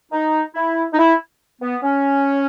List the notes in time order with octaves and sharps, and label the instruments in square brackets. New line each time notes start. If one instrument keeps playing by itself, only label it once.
[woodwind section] D#4
E4
D#4
E4
B3
C#4